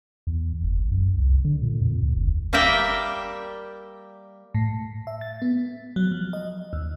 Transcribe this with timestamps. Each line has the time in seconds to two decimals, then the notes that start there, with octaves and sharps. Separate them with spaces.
0.27 E2
0.63 F#1
0.79 A1
0.92 F#2
1.15 C2
1.45 D3
1.62 A#2
1.82 F2
2.03 D2
2.16 F#1
2.53 G3 A#3 A#4 D5 E5 G5
4.55 A2
5.07 E5
5.21 A6
5.42 B3
5.96 F#3
6.12 F3
6.33 D#5
6.73 D#2